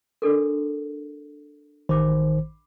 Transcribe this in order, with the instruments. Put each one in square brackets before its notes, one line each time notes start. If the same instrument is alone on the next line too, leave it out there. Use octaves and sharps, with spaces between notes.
[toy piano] D4 A4 A#4
[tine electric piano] A1 D#3 C5 [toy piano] B5 D6